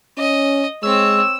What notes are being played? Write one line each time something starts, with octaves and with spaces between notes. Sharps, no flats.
C#4 D#5
G#3 C4 C#5 E6